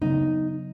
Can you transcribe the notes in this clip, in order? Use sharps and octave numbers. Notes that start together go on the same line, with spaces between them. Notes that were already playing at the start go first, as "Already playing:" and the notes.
C#3 F#3 B3 D#4